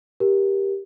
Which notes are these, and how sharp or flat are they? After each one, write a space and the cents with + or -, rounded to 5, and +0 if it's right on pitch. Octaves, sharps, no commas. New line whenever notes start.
G4 +5 A#4 +20